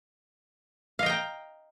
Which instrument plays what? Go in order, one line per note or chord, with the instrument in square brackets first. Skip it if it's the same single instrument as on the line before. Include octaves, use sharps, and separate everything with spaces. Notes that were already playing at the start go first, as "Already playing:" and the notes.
[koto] F5
D#5
G5
A#5